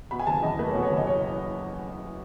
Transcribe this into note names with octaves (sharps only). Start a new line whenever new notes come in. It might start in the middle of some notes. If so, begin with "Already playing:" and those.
B2 B5
G#5
F#1 A5
E2 D#5
A3 B4
C#5
B2
C#5
F#1
D#5
C#5